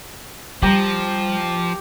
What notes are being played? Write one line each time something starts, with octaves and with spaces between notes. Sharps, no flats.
F3 G3 G4 A#5